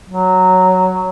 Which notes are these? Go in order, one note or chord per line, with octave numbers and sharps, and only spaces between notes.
F#3